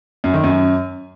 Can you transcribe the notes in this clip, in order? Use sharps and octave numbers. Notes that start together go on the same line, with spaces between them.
F#2
D#3
F#2